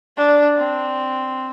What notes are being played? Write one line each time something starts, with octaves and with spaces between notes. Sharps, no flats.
D4
C4